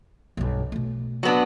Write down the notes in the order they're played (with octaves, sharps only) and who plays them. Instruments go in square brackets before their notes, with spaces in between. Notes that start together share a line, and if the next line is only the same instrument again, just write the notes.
[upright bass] B1 G2
B2 A3
[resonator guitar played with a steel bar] F#3 B3 D4